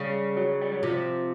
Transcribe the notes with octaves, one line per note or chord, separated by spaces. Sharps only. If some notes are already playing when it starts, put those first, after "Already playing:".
Already playing: C#3 G3
F#3
G3
F#3
C3 F3